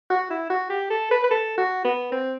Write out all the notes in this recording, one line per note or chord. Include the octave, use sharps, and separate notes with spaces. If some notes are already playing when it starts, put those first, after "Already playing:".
F#4
E4
F#4
G4
A4
B4
B4
A4
F#4
B3
C4